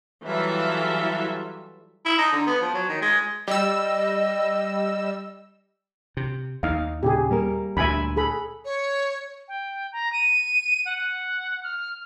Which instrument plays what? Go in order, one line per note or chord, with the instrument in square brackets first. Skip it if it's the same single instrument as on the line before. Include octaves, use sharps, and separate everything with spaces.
[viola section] E3 F#3 G3 F4 A4 E5
[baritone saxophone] E4
D#4
D3
B3
F3
F#3
D#3
G#3
[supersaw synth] G3 E6 [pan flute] D#5
[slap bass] C3
[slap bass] D#2 [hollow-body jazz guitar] D#4 [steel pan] F5
[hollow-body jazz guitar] A#2 C#3 [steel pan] G4 G#4
[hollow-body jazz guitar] G3 A#3 A#4
[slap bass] D2 A#2 [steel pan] E5 G#5 B5
[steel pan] G#4 A4 B5
[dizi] C#5
[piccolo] G5
A#5
D#7
F#5
F6